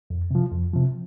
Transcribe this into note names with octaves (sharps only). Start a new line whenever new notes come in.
F2
C3 F3
F2
C3 F3